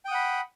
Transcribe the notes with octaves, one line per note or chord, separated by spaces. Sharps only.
F#5 G5 B5 D#6